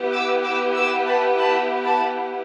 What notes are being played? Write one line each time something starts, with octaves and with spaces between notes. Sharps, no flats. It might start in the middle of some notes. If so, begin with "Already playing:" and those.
Already playing: B3 E4 G4
D6 E6
D6 E6
D6 E6
A5 B5
A5 B5
A5 B5